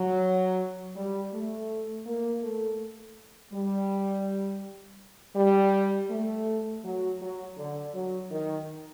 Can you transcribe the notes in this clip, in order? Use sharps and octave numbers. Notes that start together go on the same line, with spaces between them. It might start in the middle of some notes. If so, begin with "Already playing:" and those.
Already playing: F#3
G3
A3
A#3
A3
G3
G3
A3
F#3
F#3
D3
F#3
D#3